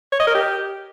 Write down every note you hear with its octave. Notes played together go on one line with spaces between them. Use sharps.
C#5
D#5
A#4
G4